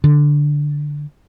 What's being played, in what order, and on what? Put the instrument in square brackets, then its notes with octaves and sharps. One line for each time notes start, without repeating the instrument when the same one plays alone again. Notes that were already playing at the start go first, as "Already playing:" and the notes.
[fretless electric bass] D3